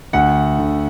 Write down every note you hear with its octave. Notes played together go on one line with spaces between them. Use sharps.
D2 F#5
D3